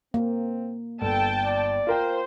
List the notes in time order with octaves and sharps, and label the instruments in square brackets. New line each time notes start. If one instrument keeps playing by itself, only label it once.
[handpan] A#3 [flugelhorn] C4
[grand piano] G1 [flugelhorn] A4 [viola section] G5 A5
[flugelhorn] D5
[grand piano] F4 A#4 G5 [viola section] C5